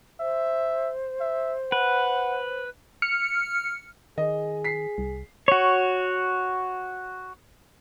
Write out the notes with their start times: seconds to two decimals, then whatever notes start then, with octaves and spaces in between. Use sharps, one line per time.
0.20 C5 E5
1.20 E5
1.72 B4 F#5
3.02 F6 C#7
4.18 D#3 G#4 D#5
4.64 B6 C7
4.98 C2
5.48 F#4 C#5